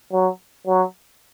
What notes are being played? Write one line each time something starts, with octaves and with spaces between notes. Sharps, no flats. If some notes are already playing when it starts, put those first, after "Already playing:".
F#3
F#3